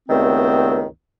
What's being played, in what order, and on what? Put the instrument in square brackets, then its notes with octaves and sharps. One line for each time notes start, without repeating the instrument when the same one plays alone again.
[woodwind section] C#2 G2 D#3 A3 B3 C4